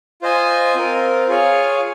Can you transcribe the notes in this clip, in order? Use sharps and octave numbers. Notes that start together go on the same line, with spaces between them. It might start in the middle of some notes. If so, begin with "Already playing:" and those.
F4 C5 D#5 G#5
C4 F4 A#4
F4 G#4 C#5 F5